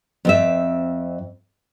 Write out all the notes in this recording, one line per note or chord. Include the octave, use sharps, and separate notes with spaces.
F2 C4 E5